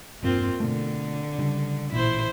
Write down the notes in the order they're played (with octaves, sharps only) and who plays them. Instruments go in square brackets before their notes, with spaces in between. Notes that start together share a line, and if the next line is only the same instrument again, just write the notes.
[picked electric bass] E1 G2 [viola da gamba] A#3 C4 F4
[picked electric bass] B2 A3 [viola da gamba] D3
[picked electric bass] C#3 G3 D4
[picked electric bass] A1 A#2 [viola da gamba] E4 C5